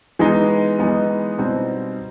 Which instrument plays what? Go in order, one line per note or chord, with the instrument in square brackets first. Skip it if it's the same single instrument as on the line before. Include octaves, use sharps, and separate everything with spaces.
[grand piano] E3 G#3 B3 D#4
E3 G#3 B3 D#4
B2 G3 C4 D#4